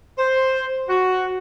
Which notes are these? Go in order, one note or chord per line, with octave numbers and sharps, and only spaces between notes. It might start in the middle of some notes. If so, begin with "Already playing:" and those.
C5
F#4